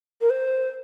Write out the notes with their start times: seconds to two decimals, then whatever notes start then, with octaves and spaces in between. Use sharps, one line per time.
0.21 A#4
0.30 C5